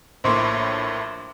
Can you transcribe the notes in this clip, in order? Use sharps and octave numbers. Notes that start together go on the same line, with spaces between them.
A#1 A2 A#3 C5 C6 D6